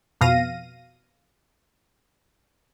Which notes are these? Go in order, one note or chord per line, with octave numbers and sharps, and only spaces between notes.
F2 B2 F5 A#6 D#7